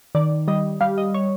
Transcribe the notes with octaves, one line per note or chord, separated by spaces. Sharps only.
D#3 D5
G3 D#5
G3 F5
D#5
C#5